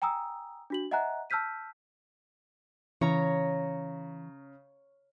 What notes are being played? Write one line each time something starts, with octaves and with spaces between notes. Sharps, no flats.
G5 G#5 A#5 D#6 E6
D4 F#4 F#7
D#5 E5 F#5 G#5 A#5 F#6
A5 E6 F6 G6 B6 D#7
C#3 E3 C#5 A#5